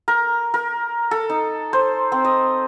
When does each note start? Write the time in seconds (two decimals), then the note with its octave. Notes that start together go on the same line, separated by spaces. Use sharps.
0.08 A#4
0.54 A#4
1.11 A4
1.30 D#4
1.73 C5
2.12 C4
2.25 D#5